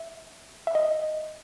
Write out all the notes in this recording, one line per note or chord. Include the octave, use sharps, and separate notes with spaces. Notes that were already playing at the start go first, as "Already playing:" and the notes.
Already playing: E5
E5
D#5